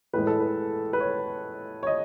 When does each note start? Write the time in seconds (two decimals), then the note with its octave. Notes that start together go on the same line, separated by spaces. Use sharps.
0.13 A2 E3 G#3 B4
0.27 A4
0.40 B4
0.93 B4
1.00 C#5
1.83 C#5
1.87 D#5